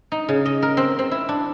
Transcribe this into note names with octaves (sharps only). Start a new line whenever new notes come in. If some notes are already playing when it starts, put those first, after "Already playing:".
D#4
C#3
D#5
A#4
C4
C4
E4
D4